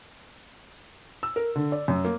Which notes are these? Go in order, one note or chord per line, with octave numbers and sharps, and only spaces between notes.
E6
A#4
D3
D5
F#2
A#3